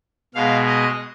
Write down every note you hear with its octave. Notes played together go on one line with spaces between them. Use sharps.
B2 G#3 F5
D#5